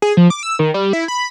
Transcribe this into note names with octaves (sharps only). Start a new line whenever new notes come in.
G#4
F3
D6
E6
D#3
G3
E4
B5